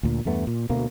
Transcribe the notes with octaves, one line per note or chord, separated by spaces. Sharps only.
D2 A#2
E2 G2 A3 B3
A#2
D2 B2 A#3